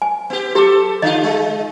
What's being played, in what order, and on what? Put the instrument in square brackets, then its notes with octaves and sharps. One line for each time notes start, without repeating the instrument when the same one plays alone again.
[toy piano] G#5
[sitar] B3 G4
[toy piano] G4 D6 [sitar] A4
[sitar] D3 F4 [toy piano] D#5
[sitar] G#3